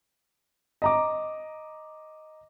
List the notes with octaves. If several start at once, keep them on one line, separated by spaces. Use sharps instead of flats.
D#5 A#5 D6